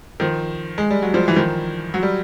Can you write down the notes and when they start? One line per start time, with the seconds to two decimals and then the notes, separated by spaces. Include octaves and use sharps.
0.20 D#3 F3
0.78 G#3
0.91 G3
1.02 F#3
1.14 F3 G3
1.28 E3
1.36 D#3 F3
1.94 F#3
2.03 G3